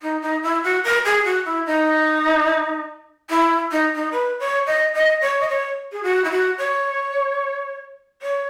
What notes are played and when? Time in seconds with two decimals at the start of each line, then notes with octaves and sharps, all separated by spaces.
0.02 D#4
0.22 D#4
0.43 E4
0.64 F#4
0.84 A#4
1.05 G#4
1.25 F#4
1.46 E4
1.66 D#4
3.30 E4
3.71 D#4
3.95 D#4
4.12 B4
4.39 C#5
4.66 D#5
4.94 D#5
5.21 C#5
5.40 D#5
5.49 C#5
5.92 G#4
6.03 F#4
6.24 E4
6.31 F#4
6.58 C#5
8.22 C#5